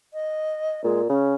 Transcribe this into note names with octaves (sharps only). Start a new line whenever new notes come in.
D#5
A#2 G#3
C#3 C#4